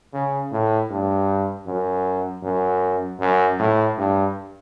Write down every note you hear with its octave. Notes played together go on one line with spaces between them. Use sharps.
C#3
A2
G2
F#2
F#2
F#2
A2
G2